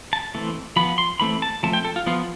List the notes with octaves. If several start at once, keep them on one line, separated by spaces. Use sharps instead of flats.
A5
E3 A3 C4
F3 B3 B5
C6
E3 A3 C4 B5
A5
F3 A3 C4 A5
G5
A4
F4
F3 B3 F4